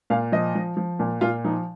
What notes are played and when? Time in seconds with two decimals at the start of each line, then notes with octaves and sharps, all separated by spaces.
0.10 A#2 F5
0.32 F3 D#5
0.55 F3
0.77 F3
0.99 A#2
1.21 A#2 F4
1.44 F3 D#4